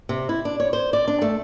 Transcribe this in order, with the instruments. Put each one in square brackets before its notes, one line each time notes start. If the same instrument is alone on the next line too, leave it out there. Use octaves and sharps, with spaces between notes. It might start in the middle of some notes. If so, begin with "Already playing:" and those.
[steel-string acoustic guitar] C3
E4
D4
C#5
C5
D5
D4
A3